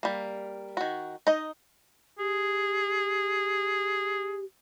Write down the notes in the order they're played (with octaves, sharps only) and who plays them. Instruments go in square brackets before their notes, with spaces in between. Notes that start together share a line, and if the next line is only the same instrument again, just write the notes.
[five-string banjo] G3 A#3
D#3 F#4
D#4 D#5
[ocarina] G4 [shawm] G#4